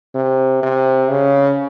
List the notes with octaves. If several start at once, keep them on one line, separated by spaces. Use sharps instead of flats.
C3
C3
C#3